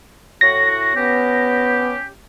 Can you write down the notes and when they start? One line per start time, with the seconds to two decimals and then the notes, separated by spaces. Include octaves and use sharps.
0.41 A2 F#4 A#6
0.95 B3 C#4 G4